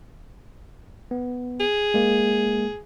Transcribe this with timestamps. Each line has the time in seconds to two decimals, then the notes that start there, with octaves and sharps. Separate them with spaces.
1.11 B3
1.60 G#4
1.94 G#3 A#3